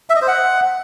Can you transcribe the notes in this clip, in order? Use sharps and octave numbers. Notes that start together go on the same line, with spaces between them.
E5
D#5
C5
F#5